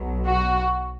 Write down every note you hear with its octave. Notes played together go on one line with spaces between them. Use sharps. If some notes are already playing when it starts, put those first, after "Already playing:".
Already playing: B1 B2 F#3
F#4